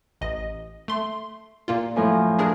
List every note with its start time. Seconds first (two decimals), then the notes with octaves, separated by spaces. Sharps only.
0.21 A1 D#5
0.88 A3 C6
1.68 A#2 A#3 F4
1.96 F#2 A2 F3
2.39 D4 G#4 A#4